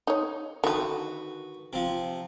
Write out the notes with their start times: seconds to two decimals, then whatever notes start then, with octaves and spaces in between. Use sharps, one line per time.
0.07 D#4 C#5
0.64 D3 D#3 F#4 B4
1.73 C3 F3